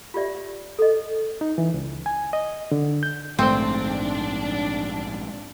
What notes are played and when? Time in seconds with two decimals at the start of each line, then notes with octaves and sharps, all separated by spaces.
0.14 F4 G4 D5 E5
0.79 A4 D#5
1.41 D#4
1.58 E3
1.74 C#2
2.06 G#5
2.33 D#5
2.72 D3
3.03 G6
3.39 A#1 G#2 D#3 A3 C4 D4 C5